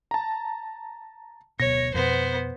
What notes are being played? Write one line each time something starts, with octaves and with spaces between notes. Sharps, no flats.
A5 A#5
D1 B2 C#5 A#6
F2 B2 B3 C5